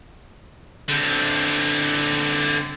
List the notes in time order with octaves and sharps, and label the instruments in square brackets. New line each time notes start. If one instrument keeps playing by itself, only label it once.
[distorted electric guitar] D3 C4